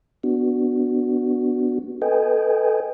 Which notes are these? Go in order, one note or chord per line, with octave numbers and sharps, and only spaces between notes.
B3 D4 F#4
A4 B4 D#5 G5 G#5